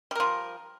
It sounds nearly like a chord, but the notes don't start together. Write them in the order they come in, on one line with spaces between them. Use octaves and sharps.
G3 A#4 F3